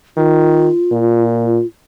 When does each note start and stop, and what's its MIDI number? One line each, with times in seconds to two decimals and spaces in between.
0.17 0.69 51
0.17 1.66 65
0.91 1.59 46